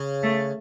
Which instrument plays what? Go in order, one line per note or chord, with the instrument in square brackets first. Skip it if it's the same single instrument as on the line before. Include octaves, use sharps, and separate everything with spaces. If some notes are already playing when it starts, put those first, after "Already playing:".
Already playing: [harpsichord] C#3
[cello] A3